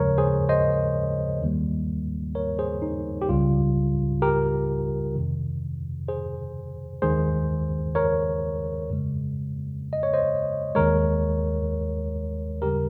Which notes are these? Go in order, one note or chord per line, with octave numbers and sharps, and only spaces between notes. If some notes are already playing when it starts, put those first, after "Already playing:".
Already playing: D#2 C#3 F3 G#3 A#4 C#5
G#4 C5
C5 D#5
D#2 D#3 G3 A#3
A#4 C#5
G#4 C5
D#4
G4
C#2 C#3 G3 F4
G4 A#4
F2 C3 D#3
G#4 C5
D#2 D#3 G#3 G#4 C5
A#4 C#5
F2 C#3 G#3
D#5
C#5
C5 D#5
D#2 D#3 G#3 A#4 C#5
D#2 C#3 G3 G4 A#4